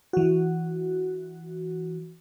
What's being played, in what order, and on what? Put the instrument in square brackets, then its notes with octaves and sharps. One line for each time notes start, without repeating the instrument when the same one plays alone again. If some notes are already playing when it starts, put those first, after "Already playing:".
[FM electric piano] E3 F#4